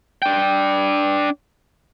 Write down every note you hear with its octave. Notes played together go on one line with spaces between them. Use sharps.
D4 G5